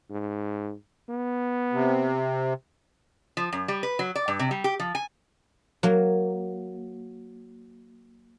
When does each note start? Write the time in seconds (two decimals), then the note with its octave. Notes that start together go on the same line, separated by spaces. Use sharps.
0.10 G#2
1.10 B3
1.73 C3
3.37 F3
3.53 F#2
3.68 G3
3.83 B4
3.99 F#3
4.16 D5
4.28 G2
4.39 C3
4.51 G3
4.64 G4
4.80 F3
4.95 G#5
5.83 F#3 A#3